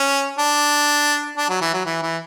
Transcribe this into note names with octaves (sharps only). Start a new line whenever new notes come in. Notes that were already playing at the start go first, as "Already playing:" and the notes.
Already playing: C#4
D4
D4
F#3
E3
F#3
E3
E3